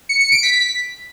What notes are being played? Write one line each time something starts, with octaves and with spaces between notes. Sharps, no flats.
C#7
C#7
D7
B6